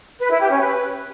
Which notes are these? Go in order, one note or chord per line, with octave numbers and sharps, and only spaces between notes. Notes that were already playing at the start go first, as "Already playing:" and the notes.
B4
E4
G4
C#4
B4